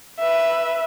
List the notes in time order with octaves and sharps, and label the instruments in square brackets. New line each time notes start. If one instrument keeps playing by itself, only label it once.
[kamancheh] B4 E5